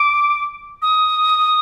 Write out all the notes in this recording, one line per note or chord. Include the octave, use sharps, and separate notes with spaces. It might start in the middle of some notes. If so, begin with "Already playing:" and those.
Already playing: D6
D#6